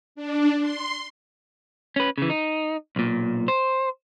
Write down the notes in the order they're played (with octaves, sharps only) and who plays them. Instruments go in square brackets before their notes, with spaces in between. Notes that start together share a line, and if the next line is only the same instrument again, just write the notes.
[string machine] D4
C6
[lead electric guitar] C#4 B4
C#3 E3
D#4
B1 A#2
C5